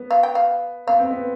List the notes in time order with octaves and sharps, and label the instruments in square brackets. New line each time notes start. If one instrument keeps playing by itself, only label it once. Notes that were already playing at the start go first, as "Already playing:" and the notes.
Already playing: [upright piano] B3
[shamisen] F5
G5
F5
[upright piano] B3 [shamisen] F5
[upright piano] C4
B3